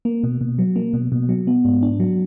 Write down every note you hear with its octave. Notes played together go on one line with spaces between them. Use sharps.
A#3
B2
B2
F#3
A#3
B2
B2
F#3
B3
G#2
D4
F#3